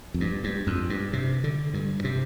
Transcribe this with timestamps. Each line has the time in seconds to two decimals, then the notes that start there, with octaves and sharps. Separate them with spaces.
0.14 F2
0.20 G2
0.44 G2
0.67 F2
0.90 G2
1.13 C3
1.44 D3
1.74 G2
2.04 C3